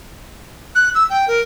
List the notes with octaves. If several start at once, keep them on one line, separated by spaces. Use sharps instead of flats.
F#6
E6
G5
A#4